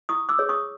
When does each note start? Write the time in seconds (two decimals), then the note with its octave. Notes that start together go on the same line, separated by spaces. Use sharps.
0.09 E4 C#6 D#6
0.29 D6 E6
0.39 G#4 C#5
0.49 C#6 D#6